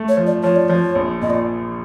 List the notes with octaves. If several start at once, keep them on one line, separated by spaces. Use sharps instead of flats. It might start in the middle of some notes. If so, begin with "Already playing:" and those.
Already playing: A3
C#5
F3
D5
F3 C#5
D5
F3 C#5
A#1
A#2 D#5
D5